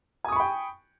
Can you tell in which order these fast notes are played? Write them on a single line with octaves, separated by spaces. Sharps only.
G#5 D#6 C#6 B5 G5